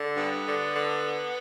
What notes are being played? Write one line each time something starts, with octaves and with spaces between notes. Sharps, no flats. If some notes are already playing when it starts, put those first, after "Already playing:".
Already playing: D3
G2 B3
D3
D3